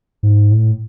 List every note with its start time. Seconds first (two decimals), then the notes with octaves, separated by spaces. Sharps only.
0.23 G#2
0.51 A2